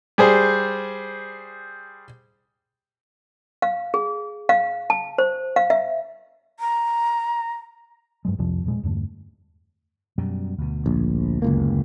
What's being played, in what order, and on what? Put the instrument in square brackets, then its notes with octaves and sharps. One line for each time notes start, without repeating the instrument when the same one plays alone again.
[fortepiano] G3 G#4 C5
[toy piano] F5
G#4
F5
A5
C5
F5
E5
[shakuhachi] A#5
[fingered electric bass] G2 F#3 G#3
C2 F2 C3 F3
E1 A#2 F#3 G#3
E2 G2 D3 A3
[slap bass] F#2 B2 G3
D2 B2
[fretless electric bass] A#1
F#1 C#2 A#3